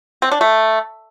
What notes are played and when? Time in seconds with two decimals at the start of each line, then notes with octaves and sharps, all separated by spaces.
0.22 C4
0.31 D4
0.41 A3